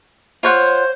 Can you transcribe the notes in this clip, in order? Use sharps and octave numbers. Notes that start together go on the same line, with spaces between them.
F4 C5 C#5 F#5